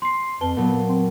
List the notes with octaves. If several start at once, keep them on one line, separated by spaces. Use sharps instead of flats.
C6 C7
F2 B4 A5 G7
A#2 F#3 B3
C4